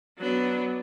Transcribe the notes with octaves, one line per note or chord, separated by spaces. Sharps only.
F#3 B3 D4